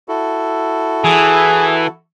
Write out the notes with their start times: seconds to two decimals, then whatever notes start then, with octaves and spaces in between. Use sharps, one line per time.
0.08 E4 F#4 A4
1.04 E3 G#4